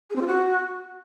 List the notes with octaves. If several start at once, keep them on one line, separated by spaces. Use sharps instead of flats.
G#4
C4
F4
F#4